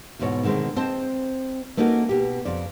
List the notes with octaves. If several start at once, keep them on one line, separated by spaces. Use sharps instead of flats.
E2 G#2 B2 E4 C#5
B2 D3 D#3 G#3 C4
C4 C5 D#5 A5
A3 A#3 C#4 D#4 F#4 A#4
B2 G4
F2 D5